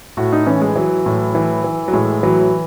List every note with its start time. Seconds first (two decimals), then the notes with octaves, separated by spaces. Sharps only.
0.17 A2 F#4
0.33 D#4
0.47 E3 C#4
0.61 G#3
0.76 E3 F#3
1.06 A2
1.35 E3
1.64 E3
1.88 F#3
1.93 A2 G#3
2.23 E3 F#3